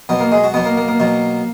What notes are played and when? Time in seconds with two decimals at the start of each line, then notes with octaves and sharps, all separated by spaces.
0.09 B2 F#3 B3
0.20 A#3
0.32 G#3
0.44 F#4
0.54 B2 F#3 B3
0.65 A#3
0.77 A#3
0.88 A#3
1.00 B2 F#3